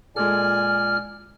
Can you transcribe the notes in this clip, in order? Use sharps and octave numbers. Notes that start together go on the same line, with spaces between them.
A#2 G#3 A4 D5 G#5 F6